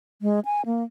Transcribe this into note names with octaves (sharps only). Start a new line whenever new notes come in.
G#3
G#5
A#3